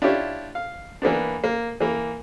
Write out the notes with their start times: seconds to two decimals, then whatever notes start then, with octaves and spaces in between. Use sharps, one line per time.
0.02 D4 E4 F4 G4 C#5
0.55 F5
1.02 E3 A#3 B3 D4
1.44 A#3
1.80 E3 A#3